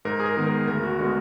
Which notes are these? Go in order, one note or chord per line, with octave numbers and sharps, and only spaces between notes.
G#2 A#4
G#4
A#4
D#3 G#3 B3
A#4
D2 A#4
F#4
D3 G#3 B3 F#4